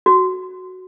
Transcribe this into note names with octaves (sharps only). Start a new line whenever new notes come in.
F#4